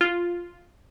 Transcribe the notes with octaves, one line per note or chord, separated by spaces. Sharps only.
F4